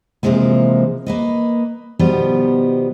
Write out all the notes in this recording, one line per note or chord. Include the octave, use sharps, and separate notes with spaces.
C3 E3 F3 G#3 A#3
A#3 B4 D#5
B2 D#3 F3 G3 B3